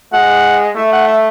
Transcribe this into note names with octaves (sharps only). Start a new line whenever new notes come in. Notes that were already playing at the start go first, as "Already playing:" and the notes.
G#3 F#5
A3 E5
F#5
E5